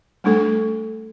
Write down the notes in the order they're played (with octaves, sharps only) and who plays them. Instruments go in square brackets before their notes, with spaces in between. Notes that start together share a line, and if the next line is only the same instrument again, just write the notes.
[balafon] G3 A3 D4 A4